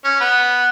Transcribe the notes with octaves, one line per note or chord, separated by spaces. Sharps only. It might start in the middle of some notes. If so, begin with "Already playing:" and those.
C#4
B3